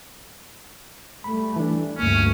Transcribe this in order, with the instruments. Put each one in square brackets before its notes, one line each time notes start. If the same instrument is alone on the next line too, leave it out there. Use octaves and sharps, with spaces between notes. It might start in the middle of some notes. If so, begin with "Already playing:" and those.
[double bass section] G3 A3 [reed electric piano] B5
[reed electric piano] E3 D4
[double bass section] D2 G2 A3 [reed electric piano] A#3 [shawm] C#4